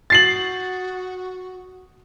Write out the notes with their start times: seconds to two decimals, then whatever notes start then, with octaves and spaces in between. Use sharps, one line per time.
0.10 F#4 A6 C7 F#7